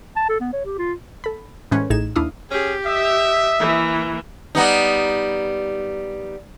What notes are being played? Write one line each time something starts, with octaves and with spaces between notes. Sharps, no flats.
A5
A4
B3
C#5
G4
F4
A4 B5
A2 E3 G#3 C#4 B4 C5
A1 A2 D#4 G#4 G#6 E7
D#2 D4 E4 F5 D#6
C#4 G4 G#4
D#5 E5
E3 A#3
G3 B3 D#4